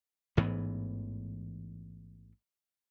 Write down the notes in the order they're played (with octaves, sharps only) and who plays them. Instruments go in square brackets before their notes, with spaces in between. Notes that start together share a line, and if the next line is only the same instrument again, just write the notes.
[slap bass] A1 G#2 E3 B3